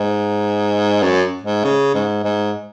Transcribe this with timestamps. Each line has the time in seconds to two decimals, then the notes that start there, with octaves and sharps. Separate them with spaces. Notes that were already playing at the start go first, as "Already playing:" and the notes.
Already playing: G#2
1.03 F#2
1.43 G#2
1.64 C#3
1.94 G#2
2.24 G#2